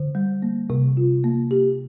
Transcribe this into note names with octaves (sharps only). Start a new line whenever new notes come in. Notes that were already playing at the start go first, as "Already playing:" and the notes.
Already playing: D3
G3
A#3
C3
F4
A#3
G4